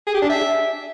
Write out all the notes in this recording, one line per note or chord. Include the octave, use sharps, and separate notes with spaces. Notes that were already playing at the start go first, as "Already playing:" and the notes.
G#4
G4
D4
E5